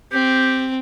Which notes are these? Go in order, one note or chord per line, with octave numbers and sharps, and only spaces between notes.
C4 G4